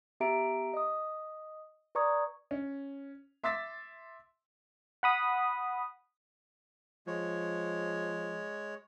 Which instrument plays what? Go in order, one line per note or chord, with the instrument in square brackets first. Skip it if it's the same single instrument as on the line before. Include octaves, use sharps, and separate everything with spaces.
[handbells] B3 G4 E5 A#5 D7
D#5 D#6
B4 D5 A#5 C#6 D#6 G#6
[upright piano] C#4
E5 C6 D6 E6 A6 B6
[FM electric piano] F#5 B5 D#6
[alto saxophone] F3 [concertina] G#3 C#5